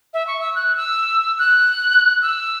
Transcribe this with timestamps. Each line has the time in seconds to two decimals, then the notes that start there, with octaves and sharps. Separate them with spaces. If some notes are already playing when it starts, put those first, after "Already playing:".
0.13 E5
0.27 C#6
0.41 E6
0.55 F#6
0.76 E6
1.38 F#6
2.22 E6